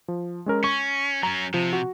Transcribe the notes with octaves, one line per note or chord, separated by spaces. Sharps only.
F3
G#3 C#4 A#4
C#4 C#6
F#3 C#4 A#5
C3 F3
F#4